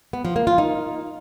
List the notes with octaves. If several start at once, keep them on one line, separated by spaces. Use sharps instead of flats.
B3
F3
A#3
F4
D#4